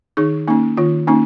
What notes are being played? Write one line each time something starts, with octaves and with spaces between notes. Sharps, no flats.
D#3 D#4 G#4
A#3 C#4 D#4
D#3 F4
A#3 C#4 D#4